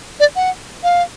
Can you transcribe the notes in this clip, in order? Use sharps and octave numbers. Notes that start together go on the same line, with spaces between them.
D5
F#5
F5